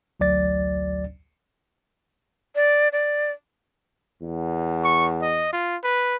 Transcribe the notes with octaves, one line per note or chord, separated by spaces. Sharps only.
A1 D2 F#3 D5 A6
D5
D5
E2
C#6
D#5
F4
B4